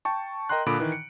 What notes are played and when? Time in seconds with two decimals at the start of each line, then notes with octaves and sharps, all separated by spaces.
0.05 G5 A5 C#6
0.49 A#4 D#5 G5 A#5 C6 F#6
0.66 A#2 D3 B5 D6 D#6 D7
0.80 D#3 E3
0.92 C#7